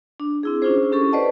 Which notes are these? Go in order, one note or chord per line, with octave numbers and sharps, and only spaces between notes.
D4
C4 E4 G#4
C#4 D4 E4 F4 G#4 C5
C#4 G4 A4 C#6
B4 C5 D5 D#5 F#5 A5